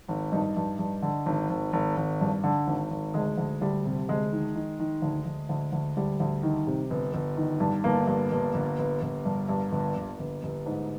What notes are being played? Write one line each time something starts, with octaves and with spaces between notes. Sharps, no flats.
G#1
G2 D#4
G2
G2
D3
G#1
G#1
G#1
G#1
G2
D3
G#1
G#1
D2 G#3
D2
D2 G3
C3
D2 G#3
D#3
D#3
D#3
D2
D2
D2
D2
D2 G3
D2
D#3
C3
G1
G1
D#3
G2
G1 A#3
G2
G1
G1
G1
G1
G2
G2
G1
G1
G1
G1
G#2